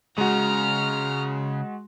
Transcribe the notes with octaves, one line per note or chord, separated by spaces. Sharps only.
C#3 G#3 F#4 A#5 F6